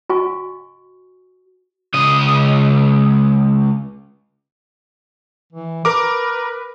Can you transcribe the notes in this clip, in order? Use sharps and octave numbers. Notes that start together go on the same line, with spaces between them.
F#4 D#5 G#5 C#6
C#2 D#5
E3
A#4 B4 D6